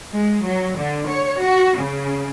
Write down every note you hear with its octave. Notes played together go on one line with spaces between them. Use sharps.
G#3
F#3
D3
C#5
F#4
C#3